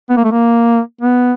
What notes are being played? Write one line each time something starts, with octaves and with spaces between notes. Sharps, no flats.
B3
A#3
A3
A#3
B3